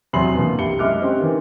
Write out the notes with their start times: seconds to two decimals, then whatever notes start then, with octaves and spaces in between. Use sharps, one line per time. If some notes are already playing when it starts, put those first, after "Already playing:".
0.13 E2 C3 F#3 C6 C7 F#7
0.34 B2 D3 E3 A#3
0.58 C2 G4 C#7 G7
0.79 F#2 G#3 E5 D6 F6 F#6
1.01 C4 C#4 G4 C5
1.20 D#3 E3